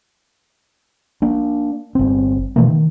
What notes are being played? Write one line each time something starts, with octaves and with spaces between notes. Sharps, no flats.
A#3 D4
G1 C4
B2 E3 A3 A#3
D#3